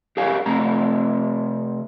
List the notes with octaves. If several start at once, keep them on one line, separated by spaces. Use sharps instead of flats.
G4 G#4 A#4 C#5 F5 G#5
C3 A3 C4 A#5